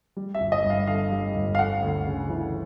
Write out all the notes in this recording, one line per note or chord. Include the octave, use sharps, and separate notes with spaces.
G3
E5
G1
D#5
G2
F5
D3 F5
G3
G1
F5
A3 F#5
D2
C#3
E3